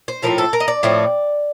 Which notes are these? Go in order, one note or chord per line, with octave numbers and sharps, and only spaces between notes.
C5
A2 F3 A3 C4 A#4
A4
A#4
D#5
D5
A2 F3 A3 C4